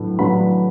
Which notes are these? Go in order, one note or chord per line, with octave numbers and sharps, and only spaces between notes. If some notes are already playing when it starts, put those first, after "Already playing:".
Already playing: A2 F#3 B3 D4
A2 F#3 B3 D4 B5